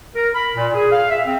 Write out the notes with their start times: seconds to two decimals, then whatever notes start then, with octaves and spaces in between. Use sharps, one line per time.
0.15 A#4
0.35 B5
0.56 A#2
0.74 G#4
0.91 F5
1.10 E5
1.25 C4